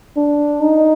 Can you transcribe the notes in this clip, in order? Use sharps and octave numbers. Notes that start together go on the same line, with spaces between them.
D4
D#4